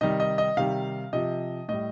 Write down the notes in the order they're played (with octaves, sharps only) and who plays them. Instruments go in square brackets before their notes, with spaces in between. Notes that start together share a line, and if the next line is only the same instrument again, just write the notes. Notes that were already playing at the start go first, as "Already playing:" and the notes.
[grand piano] C3 D#3 G3 D#5
D#5
D#5
C3 D#3 G3 F5
C3 F3 D#5
A2 G3 D#5